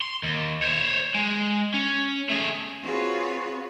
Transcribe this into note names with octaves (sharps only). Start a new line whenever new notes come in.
C6
D#2
C5 C#5
G#3
C#4
A3 G#4
C4 F4 F#4 G#4 B4 C#5